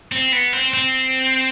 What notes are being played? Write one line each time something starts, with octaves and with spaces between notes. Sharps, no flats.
C4
B3
C4
C4